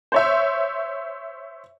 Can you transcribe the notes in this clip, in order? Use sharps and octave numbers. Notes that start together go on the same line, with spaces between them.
C5 C#5 E5